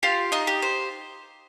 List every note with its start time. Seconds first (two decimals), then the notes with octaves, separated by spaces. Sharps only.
0.03 F4 G4 F5
0.32 D#4 D#5
0.47 G4
0.62 C5